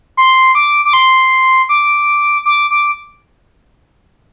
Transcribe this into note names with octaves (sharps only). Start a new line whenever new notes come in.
C6
D6
D6
C6
D6
D6
D6